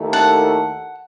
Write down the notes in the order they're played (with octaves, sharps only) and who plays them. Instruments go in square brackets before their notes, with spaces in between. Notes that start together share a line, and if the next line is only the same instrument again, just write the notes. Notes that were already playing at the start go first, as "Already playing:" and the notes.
Already playing: [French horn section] D#2 D#3 A3 E4 A4
[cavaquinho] F#5 A5